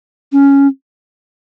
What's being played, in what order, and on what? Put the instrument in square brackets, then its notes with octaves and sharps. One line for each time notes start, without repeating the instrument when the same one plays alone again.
[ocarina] C#4